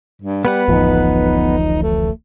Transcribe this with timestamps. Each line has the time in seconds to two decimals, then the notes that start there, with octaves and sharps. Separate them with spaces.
0.22 G2
0.45 G3 B3 B4 F#5
0.68 D1 A1 F3 D#4
1.82 A3